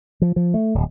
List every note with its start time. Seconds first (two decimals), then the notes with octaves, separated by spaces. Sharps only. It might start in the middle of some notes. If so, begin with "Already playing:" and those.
0.22 F3
0.36 F3
0.54 A3
0.74 D1